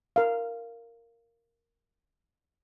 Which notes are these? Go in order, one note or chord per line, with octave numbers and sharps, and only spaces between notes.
A#4 F5